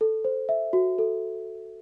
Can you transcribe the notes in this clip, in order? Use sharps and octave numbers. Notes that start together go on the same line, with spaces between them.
A4
C5
E5
F#4
A4